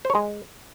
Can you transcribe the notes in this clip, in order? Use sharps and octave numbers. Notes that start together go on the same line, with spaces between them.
C5
C#5
G#3